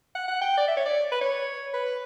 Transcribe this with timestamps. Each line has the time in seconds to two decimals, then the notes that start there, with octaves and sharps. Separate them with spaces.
0.15 F#5
0.28 F#5
0.41 G5
0.57 D5
0.68 E5
0.77 C#5
0.85 D5
1.12 B4
1.21 C#5
1.73 B4